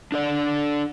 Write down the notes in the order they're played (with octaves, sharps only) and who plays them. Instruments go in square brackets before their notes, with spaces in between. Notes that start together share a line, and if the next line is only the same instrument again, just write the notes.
[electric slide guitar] D4 A4 D5